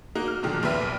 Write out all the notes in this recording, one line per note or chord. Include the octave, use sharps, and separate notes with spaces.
A#3 D#4 F#4
F6
F#2 A#2 D3 D#3 F3
A#1 D#2 A#2 B4 E5 F6